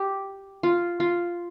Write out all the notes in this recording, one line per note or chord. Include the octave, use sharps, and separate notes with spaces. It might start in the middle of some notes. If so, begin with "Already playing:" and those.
Already playing: G4
F4
F4